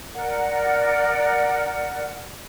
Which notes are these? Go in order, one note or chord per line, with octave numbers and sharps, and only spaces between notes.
A#4 D5 F#5